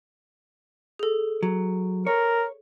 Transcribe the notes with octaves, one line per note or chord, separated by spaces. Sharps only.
G#4 A4
F#3
A#4 C#5